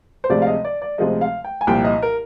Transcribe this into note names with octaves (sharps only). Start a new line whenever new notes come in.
C5
D2 C3 F3 G#3 D5
F5
D#5
D5
D5
D2 C3 F3 G#3 D#5
F5
G5
G#5
C2 A#2 F3 G5
D#5
A#4